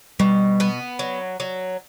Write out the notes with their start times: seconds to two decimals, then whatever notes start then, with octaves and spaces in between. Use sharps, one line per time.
0.20 B2 G3
0.60 B3
0.99 F#3
1.40 F#3